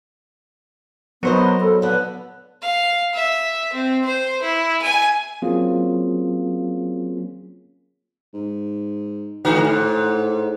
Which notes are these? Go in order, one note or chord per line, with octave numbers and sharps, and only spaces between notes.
F#3 B3 A#4 C5 D#5
A4
D3 B3 B4
F5
E5
C4
C5
E4
G#5
F#3 A#3 C4 C#4 F4 G#4
G#2
A2 D3 F#4
G#2